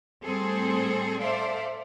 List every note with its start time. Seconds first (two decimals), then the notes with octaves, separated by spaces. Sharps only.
0.23 A2 G3 C4 G#4 A4 C5
1.21 A4 C5 D5 E5 F5